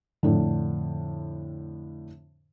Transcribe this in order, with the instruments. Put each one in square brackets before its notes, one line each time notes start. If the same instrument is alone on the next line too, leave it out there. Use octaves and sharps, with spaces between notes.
[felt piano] F2 A2 D3